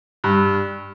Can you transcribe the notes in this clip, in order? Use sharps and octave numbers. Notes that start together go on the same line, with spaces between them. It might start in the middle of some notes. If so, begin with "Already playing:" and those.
G2